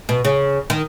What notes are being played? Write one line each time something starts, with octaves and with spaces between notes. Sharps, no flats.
B2
C#3
D#3